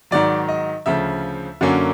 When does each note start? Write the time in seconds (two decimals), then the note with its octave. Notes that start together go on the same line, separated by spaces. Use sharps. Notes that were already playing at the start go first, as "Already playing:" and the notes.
0.11 G#2 D#3 F#3 D5
0.48 D#5
0.86 D2 C#3 F3 E5
1.61 F#2 D3 F#3 A#3 C#4